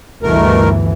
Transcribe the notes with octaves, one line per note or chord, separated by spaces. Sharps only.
G1 D2 B2 E3 A3 A#4